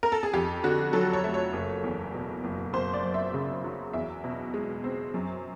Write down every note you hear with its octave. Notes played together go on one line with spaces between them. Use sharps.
A#4
A4
G#4
F2 G4
D3 F#4
F#3 A4
C#5
A3
C#5
F#1
E2
B2
F#1
F#1 C5
D5
F#2
E5
C#3
F#3
E2 E5
B2
G#3
C4
F#2